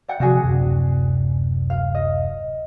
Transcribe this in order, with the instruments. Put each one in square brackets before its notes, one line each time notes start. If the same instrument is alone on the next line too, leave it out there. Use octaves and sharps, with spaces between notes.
[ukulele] D5 F#5 G5
[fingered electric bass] C3 F3 [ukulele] D4 F#4 G#4
[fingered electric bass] D1 F#2 C3
[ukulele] F5
D#5